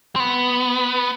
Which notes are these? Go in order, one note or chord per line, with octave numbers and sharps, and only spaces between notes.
C4
B3